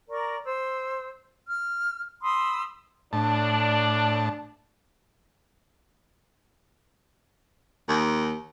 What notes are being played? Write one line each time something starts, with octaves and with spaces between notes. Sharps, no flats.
A#4 D5 A#5 C#6
C5 E6
F6
B5 C6 D#6 E6
A2 D4 A5
D#2